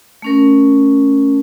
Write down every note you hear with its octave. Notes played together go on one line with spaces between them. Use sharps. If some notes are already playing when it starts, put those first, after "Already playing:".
A3 C#4 A#4